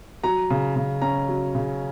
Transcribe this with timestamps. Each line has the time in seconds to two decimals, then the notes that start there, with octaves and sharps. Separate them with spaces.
0.23 F#3 A#5
0.50 C#3
0.76 C#3
1.01 C#4 A#5
1.28 F#3
1.55 C#3